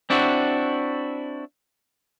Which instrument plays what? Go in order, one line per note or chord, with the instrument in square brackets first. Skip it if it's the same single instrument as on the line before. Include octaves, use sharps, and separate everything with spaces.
[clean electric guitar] C4 D4 E4 F#4